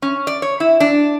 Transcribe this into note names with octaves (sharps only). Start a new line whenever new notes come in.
C#4
D5
C#5
E4
D4